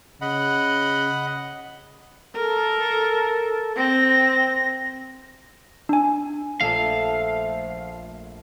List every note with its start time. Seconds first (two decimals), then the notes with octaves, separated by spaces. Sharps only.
0.21 C#3 D#5 F#5 B5
2.36 A4 A#4
3.77 C4 A#6
5.89 D4 G#5
6.61 A#1 F3 A3 A4 F5 A5